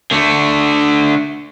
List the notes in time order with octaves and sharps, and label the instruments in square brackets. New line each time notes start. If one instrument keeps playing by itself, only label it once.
[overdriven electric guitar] D3 A3